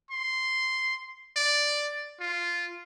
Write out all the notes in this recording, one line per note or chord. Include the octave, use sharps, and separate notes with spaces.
C6
D5
F4